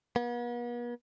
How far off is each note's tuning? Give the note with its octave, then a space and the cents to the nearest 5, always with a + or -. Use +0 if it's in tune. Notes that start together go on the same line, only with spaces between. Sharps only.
B3 -45